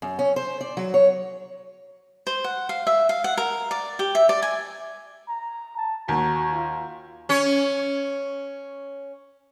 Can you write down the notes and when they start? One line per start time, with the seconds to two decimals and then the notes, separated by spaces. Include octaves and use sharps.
0.02 F#2
0.19 C#4
0.36 C5
0.61 D5
0.77 F#3
0.94 C#5
2.27 C5
2.44 F#5
2.69 F5
2.87 E5
3.09 F5
3.24 F#5
3.37 A#4
3.71 D5
3.99 G4
4.15 E5
4.29 D5
4.42 G#5
5.28 A#5
5.77 A5
6.08 D#2 F#4
6.53 F4
7.29 C#4 C#5